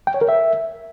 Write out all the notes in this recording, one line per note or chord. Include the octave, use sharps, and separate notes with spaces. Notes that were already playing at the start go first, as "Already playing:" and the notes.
G5
C#5
A#4
E5